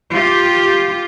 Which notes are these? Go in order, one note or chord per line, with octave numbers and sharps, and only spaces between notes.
F4 G4